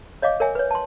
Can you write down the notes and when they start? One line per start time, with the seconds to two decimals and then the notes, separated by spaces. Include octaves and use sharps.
0.22 C#5 D#5 F5 D6
0.40 A#4 C#5 E5 G#5
0.55 B4 C#5
0.71 A5 C6